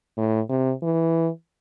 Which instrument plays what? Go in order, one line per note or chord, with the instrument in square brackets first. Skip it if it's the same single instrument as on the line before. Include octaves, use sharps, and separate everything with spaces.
[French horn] A2
C3
E3